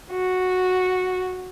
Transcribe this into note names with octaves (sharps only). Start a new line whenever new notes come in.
F#4